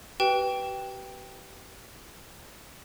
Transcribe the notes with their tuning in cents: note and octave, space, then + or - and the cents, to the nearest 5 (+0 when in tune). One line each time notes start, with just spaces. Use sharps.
G4 -40 B4 +0 G5 +0